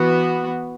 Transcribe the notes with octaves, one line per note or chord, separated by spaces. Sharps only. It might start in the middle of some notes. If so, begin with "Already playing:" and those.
Already playing: E3 B3 F#4